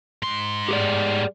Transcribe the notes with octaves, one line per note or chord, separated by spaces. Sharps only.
G#2 C6
G4 G#4 D5